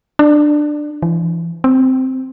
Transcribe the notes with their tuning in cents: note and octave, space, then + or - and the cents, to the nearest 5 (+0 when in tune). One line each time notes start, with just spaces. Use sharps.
D4 +15
E3 +30
C4 -10